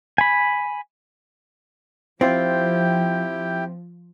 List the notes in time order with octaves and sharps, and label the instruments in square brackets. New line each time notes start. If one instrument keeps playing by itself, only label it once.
[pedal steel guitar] G#5 B5
[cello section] F3 [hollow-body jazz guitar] C4 F4 [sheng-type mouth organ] E4 G4 G5